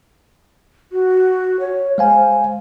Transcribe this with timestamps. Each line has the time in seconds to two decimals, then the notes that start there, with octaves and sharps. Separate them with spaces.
0.92 F#4
1.60 C#5
1.98 G#3 C5 F5 G#5